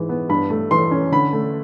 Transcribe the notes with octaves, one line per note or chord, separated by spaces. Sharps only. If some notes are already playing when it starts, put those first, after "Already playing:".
Already playing: G#2 E3 G#3
B3
G2 B5
A3
E3 C6
C#4
D3 B5
A3